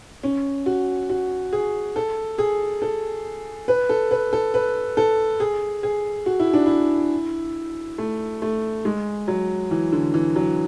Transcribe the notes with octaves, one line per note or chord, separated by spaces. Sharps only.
C#4
F#4
F#4
G#4
A4
G#4
A4
B4
A4
B4
A4
B4
A4
G#4
G#4
F#4
E4
D4
E4
A3
A3
G#3
F#3
E3
D3
E3
F#3